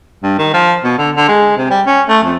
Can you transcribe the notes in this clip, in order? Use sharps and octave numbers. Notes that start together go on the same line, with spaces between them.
G2
D#3
F3
B2
D3
D3
G#3
C3
G3
C#4
A3
F2